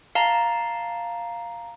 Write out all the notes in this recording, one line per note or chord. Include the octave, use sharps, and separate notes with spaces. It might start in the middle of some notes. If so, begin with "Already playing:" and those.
F5 A5 A#5